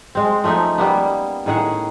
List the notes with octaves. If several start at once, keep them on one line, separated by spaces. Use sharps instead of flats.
G#3 C4
F3 A3 C#4 D#4
G3 A#3 B3
A2 D#3 G#4 F#5